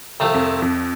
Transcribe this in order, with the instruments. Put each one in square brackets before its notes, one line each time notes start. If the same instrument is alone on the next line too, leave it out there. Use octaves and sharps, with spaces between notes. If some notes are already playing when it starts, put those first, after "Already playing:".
[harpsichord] C2 C3 F3 A3
[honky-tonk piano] F2
F2